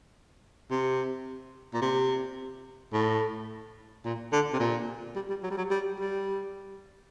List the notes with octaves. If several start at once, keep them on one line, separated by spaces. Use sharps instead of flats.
C3
A#2
C3
A2
A#2
D3
C3
A#2
G3
G3
F#3
G3
F#3
G3
G3